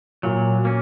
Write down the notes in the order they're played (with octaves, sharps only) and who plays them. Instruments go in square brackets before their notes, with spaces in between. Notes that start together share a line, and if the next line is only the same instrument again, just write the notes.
[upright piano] A#2 [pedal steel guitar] F#3
[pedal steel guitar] A#3 C#4